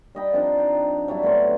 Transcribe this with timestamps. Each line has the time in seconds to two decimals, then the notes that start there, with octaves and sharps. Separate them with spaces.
0.15 G3 D#5 G5 B5
0.32 F3 C4 D4 D#4
0.58 G5 A#5
1.08 F#3 G3 D4 E4
1.23 A2 B3 C6